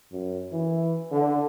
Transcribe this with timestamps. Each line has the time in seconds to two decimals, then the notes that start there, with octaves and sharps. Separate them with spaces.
0.12 F#2
0.52 E3
1.12 D3